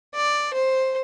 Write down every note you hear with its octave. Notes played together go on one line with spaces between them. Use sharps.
D5
C5